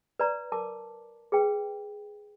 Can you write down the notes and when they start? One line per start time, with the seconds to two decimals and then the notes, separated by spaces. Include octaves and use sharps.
0.20 B4 D5 A#5
0.52 A#4 A5 D6
1.32 G#4 B4 G5